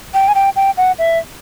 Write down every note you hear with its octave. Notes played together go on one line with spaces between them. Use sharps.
G5
G#5
G5
G5
F#5
E5